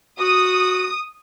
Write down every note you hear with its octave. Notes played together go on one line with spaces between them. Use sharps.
F#4 D#6